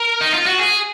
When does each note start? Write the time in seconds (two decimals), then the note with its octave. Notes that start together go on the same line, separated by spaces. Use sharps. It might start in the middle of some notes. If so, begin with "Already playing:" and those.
Already playing: A#4
0.21 D#4
0.34 F4
0.46 F#4
0.58 G#4